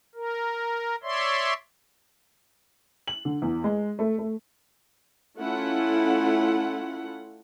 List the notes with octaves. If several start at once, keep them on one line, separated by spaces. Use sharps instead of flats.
A#4
C#5 D5 E5 C6
F#7
D3
E2
G#3
A3
A3
A3 C#4 E4 F4 A4 F#5